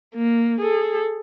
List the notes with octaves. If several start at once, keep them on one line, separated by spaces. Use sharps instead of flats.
A#3
G#4 A4